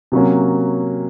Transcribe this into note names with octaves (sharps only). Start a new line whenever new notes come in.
C3 F#3 A#3 C#4 F#4